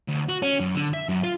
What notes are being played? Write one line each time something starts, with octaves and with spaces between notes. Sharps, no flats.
D2
F#4
C#4
F#2
D3
E5
F#2
F4